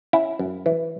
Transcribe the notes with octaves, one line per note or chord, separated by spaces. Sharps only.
C#4 E4
F#2
E3